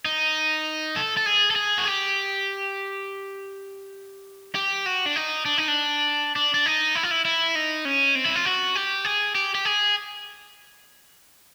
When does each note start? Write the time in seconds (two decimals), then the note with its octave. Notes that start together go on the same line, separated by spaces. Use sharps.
0.05 D#4
0.96 A4
1.17 A4
1.26 G#4
1.51 A4
1.56 G#4
1.78 F#4
1.85 G4
4.55 G4
4.86 F#4
5.06 D4
5.16 D#4
5.45 D4
5.58 D#4
5.68 D4
6.36 D4
6.54 D4
6.66 D#4
6.95 E4
7.03 F4
7.11 E4
7.25 E4
7.55 D#4
7.85 C#4
8.15 C4
8.25 E4
8.35 F4
8.45 F#4
8.75 G4
9.05 G#4
9.35 G4
9.55 G4
9.65 G#4